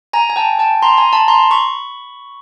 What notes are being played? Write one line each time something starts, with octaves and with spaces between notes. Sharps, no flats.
G#5 A#5
G#5
G5 A5
G5 A5
A#5 C6
G#5 A#5
A5 B5
A#5 C6
B5 C#6